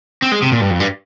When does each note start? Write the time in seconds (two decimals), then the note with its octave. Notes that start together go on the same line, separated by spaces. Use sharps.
0.22 C4
0.32 G#3
0.42 C3
0.52 A#2
0.61 G2
0.70 F2
0.80 G2